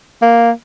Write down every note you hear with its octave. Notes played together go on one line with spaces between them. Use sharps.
A#3